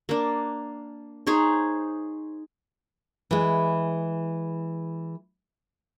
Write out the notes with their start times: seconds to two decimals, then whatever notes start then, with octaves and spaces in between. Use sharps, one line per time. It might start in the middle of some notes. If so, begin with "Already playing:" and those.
0.09 A#3 D4
1.27 D#4 G#4 C5 C#5
3.31 E3 G#3